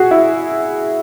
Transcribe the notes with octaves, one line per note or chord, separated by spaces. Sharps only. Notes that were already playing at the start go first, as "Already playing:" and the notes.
Already playing: F#4 G#4
E4